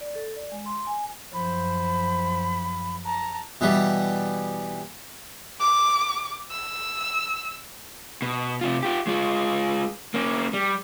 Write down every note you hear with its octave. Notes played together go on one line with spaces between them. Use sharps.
D5
A4
D5
G#3
C6
G#5
F#2 F3 C5 B5
A5 A#5
B2 E3 G3
D6
E6
B2
C3 F4
F4 G4
G#3 F4
A#3 C#4
G3